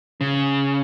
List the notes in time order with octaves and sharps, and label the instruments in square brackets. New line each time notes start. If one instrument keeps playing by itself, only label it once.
[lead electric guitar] C#3